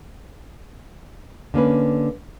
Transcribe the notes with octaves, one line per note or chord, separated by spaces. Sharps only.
D3 A#3 C#4 B4